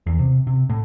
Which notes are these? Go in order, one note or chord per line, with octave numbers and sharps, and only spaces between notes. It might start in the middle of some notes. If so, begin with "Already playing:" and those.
E2
C3
C3
A2